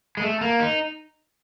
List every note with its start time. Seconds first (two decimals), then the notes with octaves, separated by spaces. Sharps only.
0.17 G#3
0.22 A3
0.41 A#3
0.60 D#4